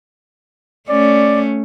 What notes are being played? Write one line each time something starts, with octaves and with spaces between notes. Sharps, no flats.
A3 C#4 D5